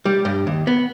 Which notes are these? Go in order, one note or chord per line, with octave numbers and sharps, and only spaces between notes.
G3
G2
D#2
B3